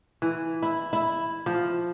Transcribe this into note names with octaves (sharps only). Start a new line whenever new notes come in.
E3
E4
E4
F3